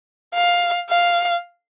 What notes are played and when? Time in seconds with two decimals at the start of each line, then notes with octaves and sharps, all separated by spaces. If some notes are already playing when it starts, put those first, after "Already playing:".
0.34 F5
0.90 F5